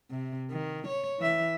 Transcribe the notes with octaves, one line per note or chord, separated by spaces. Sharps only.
C3
D#3
C#5
E3 E5